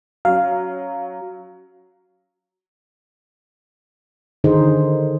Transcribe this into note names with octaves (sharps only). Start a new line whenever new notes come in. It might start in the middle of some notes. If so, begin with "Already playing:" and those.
F#3 C#4 F5
D3 D#3 D#4 G#4 C5